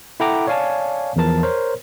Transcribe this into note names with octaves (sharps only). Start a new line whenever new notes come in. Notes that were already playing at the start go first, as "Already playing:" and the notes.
E4 A4 F#5 G5 A#5 D6
C#5 D5 F5 G#5 A5
E2 E3 F3 A#4 A5 A6
A#4 C5 C#5